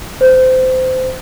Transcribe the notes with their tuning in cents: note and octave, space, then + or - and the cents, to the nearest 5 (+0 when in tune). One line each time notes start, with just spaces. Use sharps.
C5 -25